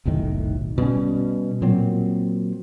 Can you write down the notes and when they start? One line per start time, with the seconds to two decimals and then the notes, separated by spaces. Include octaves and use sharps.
0.05 F1 B1 A2 D#3
0.78 B2 G3 C#4
1.62 A#2 F#3 C4